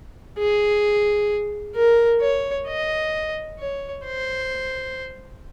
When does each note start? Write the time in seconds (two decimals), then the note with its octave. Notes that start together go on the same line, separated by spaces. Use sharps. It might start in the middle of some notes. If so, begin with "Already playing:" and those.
0.38 G#4
1.76 A#4
2.21 C#5
2.67 D#5
3.59 C#5
4.05 C5